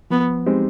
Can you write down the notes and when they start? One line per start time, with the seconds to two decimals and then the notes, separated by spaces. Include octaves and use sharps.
0.10 F3 B3
0.46 G#3 C4 D#4 G4